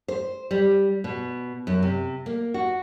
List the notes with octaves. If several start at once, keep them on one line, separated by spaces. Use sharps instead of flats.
C5
G3
B2
F#2
C3
A#3
F#4